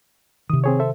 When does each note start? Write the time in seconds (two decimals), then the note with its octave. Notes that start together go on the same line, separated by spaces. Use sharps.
0.50 C3 D#3 D#6
0.64 C4 G#4 C#5
0.80 A4 C5 E5